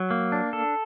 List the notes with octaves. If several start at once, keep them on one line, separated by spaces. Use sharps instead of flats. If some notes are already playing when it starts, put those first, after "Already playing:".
Already playing: F#3
A#3
D4
A4